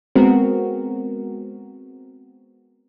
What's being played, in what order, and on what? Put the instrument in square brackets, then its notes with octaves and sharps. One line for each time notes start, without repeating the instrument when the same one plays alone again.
[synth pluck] G#3 B3 C4 F#4 A#4